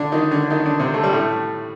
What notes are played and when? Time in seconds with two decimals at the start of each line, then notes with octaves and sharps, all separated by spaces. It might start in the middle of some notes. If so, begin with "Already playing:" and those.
Already playing: D3 D4
0.12 D#3 D#4
0.31 D3 D4
0.50 D#3 D#4
0.65 D3 D4
0.79 C3 C4
0.94 A3
1.03 G3
1.13 A2 A3